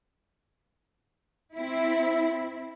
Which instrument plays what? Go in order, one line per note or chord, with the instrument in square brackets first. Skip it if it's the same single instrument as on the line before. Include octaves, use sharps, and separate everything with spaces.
[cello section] C4 E4